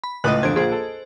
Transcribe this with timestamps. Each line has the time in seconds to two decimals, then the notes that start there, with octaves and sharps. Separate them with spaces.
0.04 B5
0.24 C#2 A2 B4 D#5 D#6 F#6
0.43 F2 D3 C5 G#6 D7
0.56 A#1 F4 G#4 C5
0.72 A4